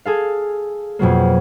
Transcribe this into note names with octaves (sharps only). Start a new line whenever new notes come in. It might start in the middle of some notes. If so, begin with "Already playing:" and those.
G#4 A4 F5
F2 B2 F#3 A#3